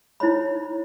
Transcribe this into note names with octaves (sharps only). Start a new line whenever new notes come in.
D#4 E4 C5 C#5 B5